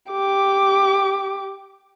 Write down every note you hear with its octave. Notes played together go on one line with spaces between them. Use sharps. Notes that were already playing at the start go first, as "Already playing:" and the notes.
G4 D6